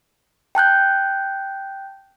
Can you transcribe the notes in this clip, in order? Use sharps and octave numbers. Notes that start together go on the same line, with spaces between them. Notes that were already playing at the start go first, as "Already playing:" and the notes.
G5 A5 F#6 G6